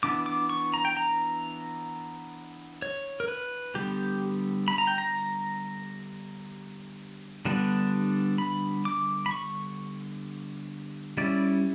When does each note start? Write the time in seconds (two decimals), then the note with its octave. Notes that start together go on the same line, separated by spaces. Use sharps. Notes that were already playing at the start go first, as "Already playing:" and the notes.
0.03 E3 B3 D4 D6
0.26 D6
0.49 C#6
0.74 A#5
0.85 G5
0.97 A#5
2.82 C#5
3.20 A#4
3.28 B4
3.75 D3 G3 B3 G4
4.68 B5
4.78 A#5
4.87 G5
4.98 A#5
7.45 D3 G3 B3 D4
8.38 B5
8.85 D6
9.26 B5
9.31 C#6
11.17 G3 C#4 E4 D5